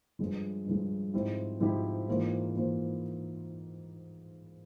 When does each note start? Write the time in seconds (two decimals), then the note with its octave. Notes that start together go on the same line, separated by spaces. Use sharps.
0.19 G2 F3 G#3
0.66 G2 F3 G#3
1.14 G#2 F3 C4 E4 G4
1.60 G#2 F3 C4 E4 G4
2.08 G#2 E3 A#3 F4 C5
2.56 E3 A#3 F4 C5